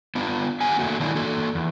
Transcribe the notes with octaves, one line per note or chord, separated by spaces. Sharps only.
B3 D4 F4
B3 G4 F#5 G#5
A3 A#3 F#4
D#3 F#3 A3 A#3 D4 E4
A#3 F#4 A4
E2